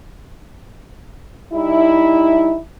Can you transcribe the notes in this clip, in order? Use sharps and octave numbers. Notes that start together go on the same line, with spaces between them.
G3 D#4 E4